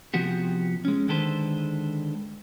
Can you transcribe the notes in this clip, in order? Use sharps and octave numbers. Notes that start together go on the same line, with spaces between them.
C3 F3 B3 F#4 G4
G#3 C#4
D3 D#3 G#3 A4 B4 C5